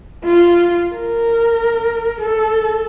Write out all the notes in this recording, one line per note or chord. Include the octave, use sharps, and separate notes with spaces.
F4
A#4
A4